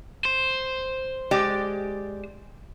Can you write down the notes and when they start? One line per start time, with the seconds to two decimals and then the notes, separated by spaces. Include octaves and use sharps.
0.25 C5
1.31 G#3 G4 D5